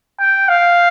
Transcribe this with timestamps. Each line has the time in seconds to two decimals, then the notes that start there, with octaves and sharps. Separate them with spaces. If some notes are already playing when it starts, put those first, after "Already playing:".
0.20 G5
0.49 F5